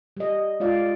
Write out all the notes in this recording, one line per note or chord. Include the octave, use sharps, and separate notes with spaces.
G3 D#5
G#3 F4 D5 F5